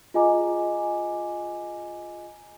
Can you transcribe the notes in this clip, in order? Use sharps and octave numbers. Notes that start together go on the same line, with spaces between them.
F4 G#4 D#5 G#5 A#5 D6